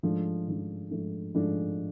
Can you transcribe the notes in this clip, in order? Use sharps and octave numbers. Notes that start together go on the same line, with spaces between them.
G#2 F3 A3 D4
G#2 F3 A3 D4
G#2 F3 A3 D4
G#2 F3 A3 D4